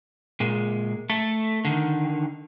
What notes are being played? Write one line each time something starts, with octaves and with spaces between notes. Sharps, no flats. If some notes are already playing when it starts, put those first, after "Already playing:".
A#2 G#3
A3 A4
D3 D#3